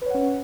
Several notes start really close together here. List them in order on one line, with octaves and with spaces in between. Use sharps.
B4 C#5 F#5 C#4